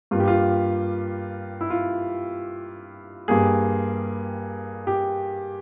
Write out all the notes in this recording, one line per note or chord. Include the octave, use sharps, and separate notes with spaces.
G2 G3 A#3 F4
G4
F4
E4
F4
G2 G3 A#3 G#4
G4